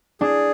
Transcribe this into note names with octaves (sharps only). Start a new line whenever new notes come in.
D4 G#4